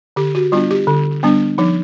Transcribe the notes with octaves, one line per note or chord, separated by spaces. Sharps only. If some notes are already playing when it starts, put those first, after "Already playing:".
D3 G4
F#4
G3 B3 D4 F4
G4
D3
G3 B3 D4
F3 D#4